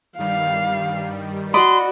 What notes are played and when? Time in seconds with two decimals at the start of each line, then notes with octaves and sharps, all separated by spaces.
0.19 G2 D#3 G3 F5
1.54 F#4 D5 D#5 B5 C6